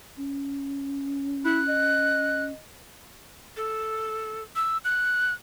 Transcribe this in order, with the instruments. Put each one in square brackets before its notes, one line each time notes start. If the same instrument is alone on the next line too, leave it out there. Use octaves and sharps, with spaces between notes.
[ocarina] C#4
[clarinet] E4 [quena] F#6
[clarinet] D#5
[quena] A4
E6
F#6